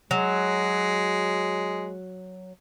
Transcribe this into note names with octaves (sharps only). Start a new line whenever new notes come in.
F#3 G#3